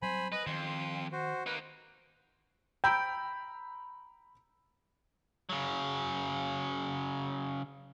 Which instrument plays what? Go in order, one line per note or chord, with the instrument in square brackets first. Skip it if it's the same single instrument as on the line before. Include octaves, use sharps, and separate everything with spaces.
[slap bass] F#3 G3 C4 [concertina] C5 G#5 B5
[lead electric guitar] B4 [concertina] D#5
[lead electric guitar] F2 [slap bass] D#3 [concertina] C6
[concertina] F#4 C5
[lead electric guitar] A#3 D#4 [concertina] B4
[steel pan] G5 [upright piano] A#5 B5 E6
[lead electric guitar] C#3 F#3